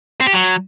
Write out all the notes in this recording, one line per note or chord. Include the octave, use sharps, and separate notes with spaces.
C4
G4
F#3